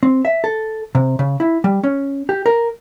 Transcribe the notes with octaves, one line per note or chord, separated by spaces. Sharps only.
C4
E5
A4
C3
C#3
E4
G3
C#4
G4
A#4